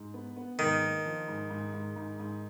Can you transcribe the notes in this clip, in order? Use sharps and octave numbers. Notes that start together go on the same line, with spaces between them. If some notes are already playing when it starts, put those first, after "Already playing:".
Already playing: G#2
B3
B3
G#2 D#3
A#3
F3
G#2
G#2
G#2
G#2
G#2